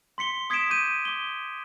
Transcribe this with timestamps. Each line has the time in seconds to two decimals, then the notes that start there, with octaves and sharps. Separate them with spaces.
0.18 C6 B6 C#7 G7
0.50 D#6 G#6 B6 C#7 D7 E7
0.70 D6 G6 D#7
1.05 D6 G7